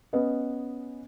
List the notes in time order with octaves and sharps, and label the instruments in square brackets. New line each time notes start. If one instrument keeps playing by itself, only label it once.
[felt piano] B3 C#4 B4 D#5